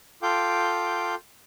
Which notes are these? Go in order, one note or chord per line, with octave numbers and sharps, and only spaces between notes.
F4 A4 F5 G5 D6 G6